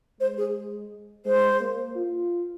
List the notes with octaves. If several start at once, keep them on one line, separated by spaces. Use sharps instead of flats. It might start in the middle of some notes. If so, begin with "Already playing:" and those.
G#3 C5
G#4
G#3 C5
A#3
F4